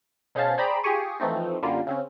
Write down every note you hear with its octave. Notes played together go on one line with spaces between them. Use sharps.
B2 C#4 G#4 C5 F5 A5
G#4 C5 D5 G5 A#5 B5
F4 G4 G#4 G#5 C#6 D#6
E3 F3 A3 C4 D#4
F#2 D3 G3 A#3 F4
C#3 C4 C#4